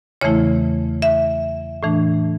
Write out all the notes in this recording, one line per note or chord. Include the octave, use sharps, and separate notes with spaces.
E2 C#3 E3 A3 E4 C#5
E5
A2 E3 A3 D4